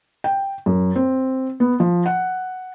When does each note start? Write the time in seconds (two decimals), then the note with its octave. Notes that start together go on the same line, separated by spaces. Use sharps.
0.24 G5
0.66 F#2
0.96 C4
1.60 B3
1.80 F3
2.06 F#5